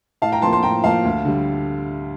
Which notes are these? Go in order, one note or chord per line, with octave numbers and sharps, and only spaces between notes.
A2 F5 A5
G5 A#5
F3 A#3 A5 C6
A5 C6
A2 G5 A#5
F3 A#3 F5 A5
D2
D3 G3